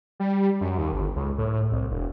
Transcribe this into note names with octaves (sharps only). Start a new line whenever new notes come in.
G3
F#2
D#2
G1
C#2
A2
C2
E1